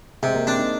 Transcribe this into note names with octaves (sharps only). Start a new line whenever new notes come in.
C3 G#3
A#3
C4 D4
D#4